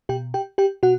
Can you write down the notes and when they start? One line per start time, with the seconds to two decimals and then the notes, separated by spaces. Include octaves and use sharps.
0.09 B2 G4 G5
0.34 G4 G5
0.58 G4 G5
0.83 B2 F#4 F#5